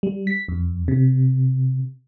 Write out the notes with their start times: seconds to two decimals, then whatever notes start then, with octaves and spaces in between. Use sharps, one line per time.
0.03 G3
0.27 B6
0.48 F2
0.88 C3